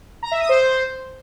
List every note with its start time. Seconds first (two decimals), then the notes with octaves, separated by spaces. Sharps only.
0.23 A#5
0.31 E5
0.40 D#6
0.49 C5